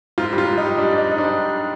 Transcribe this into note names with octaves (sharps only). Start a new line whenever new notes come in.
G#2 F4
G3
F4
G3
D#4
G3
G3 D4
G#2 D#4
G#2 D#4
D4
G3